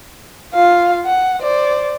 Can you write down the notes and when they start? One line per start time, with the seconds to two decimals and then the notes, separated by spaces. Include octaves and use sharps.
0.54 F4 F5
1.05 F#5
1.41 C5 D5